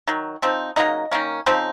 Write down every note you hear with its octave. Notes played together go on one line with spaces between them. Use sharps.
D#3 F#3
F3 C4 D#4
C#3 F#3 A#3 D#4 D#5
D#3 A#3 C#4
C#3 F3 C4 D#4